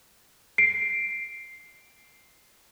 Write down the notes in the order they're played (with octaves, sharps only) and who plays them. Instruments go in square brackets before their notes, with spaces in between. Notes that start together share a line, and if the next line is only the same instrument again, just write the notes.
[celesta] C7 D7